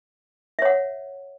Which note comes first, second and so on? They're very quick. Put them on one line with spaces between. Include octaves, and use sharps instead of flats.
E5 C#5 F#5